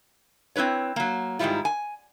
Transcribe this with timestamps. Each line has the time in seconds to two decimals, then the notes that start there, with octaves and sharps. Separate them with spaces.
0.56 C4 C#4 E4 B4 C#5
0.96 F#3 A#3
1.39 G#2 D#3 F3 G3 E4 F4
1.65 G#5